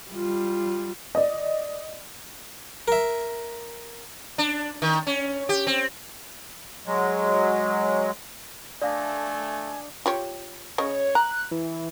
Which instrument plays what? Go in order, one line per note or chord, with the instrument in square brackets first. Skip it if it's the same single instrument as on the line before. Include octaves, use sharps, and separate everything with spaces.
[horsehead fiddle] G3 F4
[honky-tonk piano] D5 D#5
[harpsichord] A#4 E5
[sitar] D4
D#3
C#4
G4
C4
[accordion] F#3 G#3
[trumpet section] A3 [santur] D4 D#5 [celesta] D5 F5 A#6 [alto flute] G#5
[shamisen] F4 G4 C#5
[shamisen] C#3 D#5 [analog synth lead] C#5
[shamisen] A#5 [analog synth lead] F#6
[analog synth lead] E3